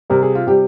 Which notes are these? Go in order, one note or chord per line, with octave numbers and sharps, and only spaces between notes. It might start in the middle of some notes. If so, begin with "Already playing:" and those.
C3 G3 A#4
G#4
F4
C3 G3 G4